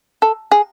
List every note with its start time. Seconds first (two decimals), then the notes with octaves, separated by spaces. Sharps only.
0.22 A4
0.52 G#4